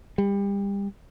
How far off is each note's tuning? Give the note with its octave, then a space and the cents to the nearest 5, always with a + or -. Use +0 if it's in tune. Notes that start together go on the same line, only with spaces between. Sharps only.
G3 +30